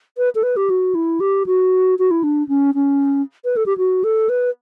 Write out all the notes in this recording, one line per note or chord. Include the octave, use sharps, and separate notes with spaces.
B4
A4
B4
G4
F#4
E4
G4
F#4
F#4
E4
D4
C#4
C#4
B4
A4
G4
F#4
A4
B4